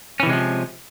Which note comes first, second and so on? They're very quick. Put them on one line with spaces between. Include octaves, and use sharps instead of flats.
C#4 E3 C3 G#3 F3